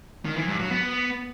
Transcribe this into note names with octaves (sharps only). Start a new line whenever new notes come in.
D#3
E3
G2
F#3
B3